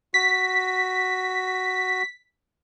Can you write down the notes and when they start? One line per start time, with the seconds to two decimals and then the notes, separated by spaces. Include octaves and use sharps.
0.14 F#4 B6